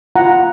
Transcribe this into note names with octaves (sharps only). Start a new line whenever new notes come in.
F4 F#5 A#5